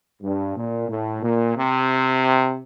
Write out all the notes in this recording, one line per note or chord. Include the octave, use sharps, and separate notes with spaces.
G2
A#2
A2
A#2
C3